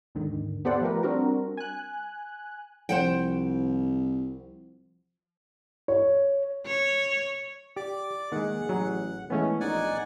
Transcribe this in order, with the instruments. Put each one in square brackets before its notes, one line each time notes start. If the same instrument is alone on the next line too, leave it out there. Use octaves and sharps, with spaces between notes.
[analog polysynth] D#2 G#2 D3 D#3
B3 G4 A4 C5 D5 F#5
F3 A3 F4 G4 A#4 B4
G3 C4 D4 F#4 A#4
G#5 F#6
[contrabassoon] C2 [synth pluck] F3 [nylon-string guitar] C5 F#5 G5
[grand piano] C#5
[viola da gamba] C#5
[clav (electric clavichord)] G4 [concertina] D5 D6
[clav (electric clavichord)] D#3 G#3 [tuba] A#3 [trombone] G#4 [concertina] F#5
[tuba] A1 [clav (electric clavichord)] F#3 A#5
[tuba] E3 [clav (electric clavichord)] G#3 A3 B3 [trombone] C#4
[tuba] A#1 [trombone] D#4 [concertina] D5 F#5 G#5